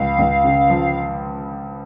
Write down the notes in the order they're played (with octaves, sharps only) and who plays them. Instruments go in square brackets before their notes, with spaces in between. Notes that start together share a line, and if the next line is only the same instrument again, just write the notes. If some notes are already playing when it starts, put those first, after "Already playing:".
Already playing: [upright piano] C#2 F3 [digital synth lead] F5
[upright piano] C#2
C#3
F3